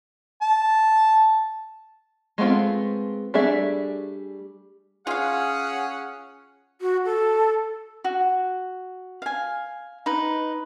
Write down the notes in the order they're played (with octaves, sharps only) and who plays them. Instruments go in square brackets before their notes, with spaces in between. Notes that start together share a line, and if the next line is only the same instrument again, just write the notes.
[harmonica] A5
[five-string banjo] G#3 A3 B3 C4 F4
G3 A3 D4 G#4 E5
[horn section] C#4 F#5 [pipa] F4 F5 [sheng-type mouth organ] G#4
[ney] F#4
A4
[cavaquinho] F#4
F5 G#5
D#4 B4